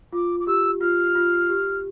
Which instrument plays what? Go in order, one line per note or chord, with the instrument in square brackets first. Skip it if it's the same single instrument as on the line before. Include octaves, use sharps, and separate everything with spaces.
[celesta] F4 [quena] D6
[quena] D6
[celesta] G4 [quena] E6
[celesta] F4 [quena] F6
[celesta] F4
G4